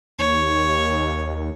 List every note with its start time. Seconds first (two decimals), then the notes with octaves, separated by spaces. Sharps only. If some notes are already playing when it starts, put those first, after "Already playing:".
0.19 D#2 C#5